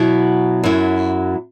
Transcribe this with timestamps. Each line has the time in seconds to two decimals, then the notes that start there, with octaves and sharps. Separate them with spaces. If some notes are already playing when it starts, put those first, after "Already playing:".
Already playing: B2 F#3 E4
0.64 F#2 F#3 E4